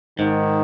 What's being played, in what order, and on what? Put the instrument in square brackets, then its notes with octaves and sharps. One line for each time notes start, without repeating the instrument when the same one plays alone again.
[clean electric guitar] G#2 [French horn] D#3